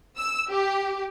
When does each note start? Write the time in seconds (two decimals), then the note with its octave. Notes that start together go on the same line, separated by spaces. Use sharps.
0.17 E6
0.50 G4